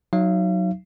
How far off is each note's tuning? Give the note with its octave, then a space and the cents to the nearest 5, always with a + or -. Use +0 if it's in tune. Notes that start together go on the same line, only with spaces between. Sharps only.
F#3 +0 D#4 +0 F5 -45